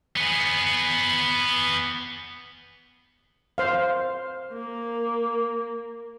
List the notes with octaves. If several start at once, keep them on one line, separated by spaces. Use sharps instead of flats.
B3 G#4
C5 F5
A#3